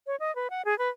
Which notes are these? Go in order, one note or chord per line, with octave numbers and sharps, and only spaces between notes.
C#5
D#5
B4
F#5
G#4
B4